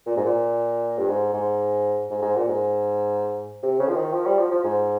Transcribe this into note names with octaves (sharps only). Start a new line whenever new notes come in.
A#2
G#2
A#2
G2
G#2
G#2
G#2
G#2
A#2
G#2
C3
C#3
F3
D#3
F3
G3
F3
F3
G#2